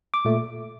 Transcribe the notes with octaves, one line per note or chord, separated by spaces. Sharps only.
D6
A#2 A3